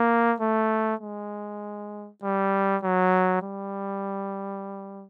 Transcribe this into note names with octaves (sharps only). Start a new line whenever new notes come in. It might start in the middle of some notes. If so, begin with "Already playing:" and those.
Already playing: A#3
A3
G#3
G3
F#3
G3